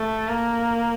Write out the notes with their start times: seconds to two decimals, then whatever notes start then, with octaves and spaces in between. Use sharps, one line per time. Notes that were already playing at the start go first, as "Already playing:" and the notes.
Already playing: A3
0.29 A#3